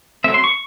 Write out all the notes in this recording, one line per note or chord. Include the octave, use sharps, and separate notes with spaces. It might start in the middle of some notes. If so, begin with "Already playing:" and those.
F#3 A3 C4 E5
C6
C#6